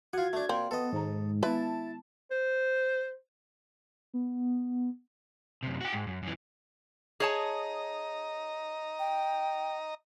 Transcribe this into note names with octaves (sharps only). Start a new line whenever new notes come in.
F4 F#4 F#5 G#6
A3 D4 F#4
A#2 C4
B3 A4 D#5
G#2 D#3 A#5
G#3 B3 E4 B4 A5
C5
B3
F#2 C3
F#4 G5
G#2
F#2
F#2 E3
G#4 C#5 D#5 A5 A#5
G5